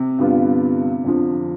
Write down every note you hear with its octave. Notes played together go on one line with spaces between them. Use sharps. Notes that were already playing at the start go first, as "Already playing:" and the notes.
Already playing: C3
G2 D3 G3 B3 F4
F2 D3 F3